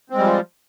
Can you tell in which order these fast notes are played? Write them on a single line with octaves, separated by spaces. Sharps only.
C4 G#3 G3 F3